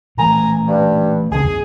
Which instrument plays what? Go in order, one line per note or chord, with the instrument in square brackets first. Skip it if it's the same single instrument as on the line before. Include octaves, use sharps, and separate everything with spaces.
[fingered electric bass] A#2 E3 A3 [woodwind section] G#5 A#5
[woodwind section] G2
[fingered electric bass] C#2 C#3 C#4 [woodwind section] G#4
[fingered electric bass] E2 G2